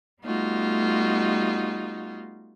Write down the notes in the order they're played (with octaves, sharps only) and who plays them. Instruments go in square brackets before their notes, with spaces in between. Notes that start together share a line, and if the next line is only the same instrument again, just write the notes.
[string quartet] G3 A3 B3 D#4 F4 F#4